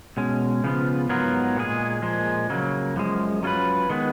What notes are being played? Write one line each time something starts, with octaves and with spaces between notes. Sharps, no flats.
B2 G#3 C#4
C#3 F3 B3 F4
G#2 F#3 B3 F4 A#4
A#2 G#3 D#4 G#4
A#2 F3 G#3
C#3 F#3 A#3
F#2 F3 G#3
F#3 C#4 F4 B4
D#3 G#3 B3